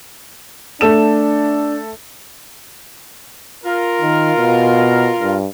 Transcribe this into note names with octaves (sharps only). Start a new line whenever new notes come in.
A3 D4 A4 E7
F4 A#4
D#3
B2
G2